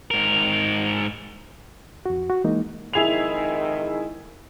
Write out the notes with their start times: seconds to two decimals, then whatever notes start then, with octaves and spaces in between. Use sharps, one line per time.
0.11 G#2 A#4
2.06 F2 F#4
2.30 F#4
2.44 E3 G#3 A#3 D#4
2.93 F2 G#2 D#3 E4 G#4 F7